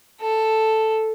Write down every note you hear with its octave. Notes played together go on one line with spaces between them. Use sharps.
A4